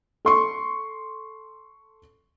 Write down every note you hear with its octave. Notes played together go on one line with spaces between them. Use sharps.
A4 C6 C#6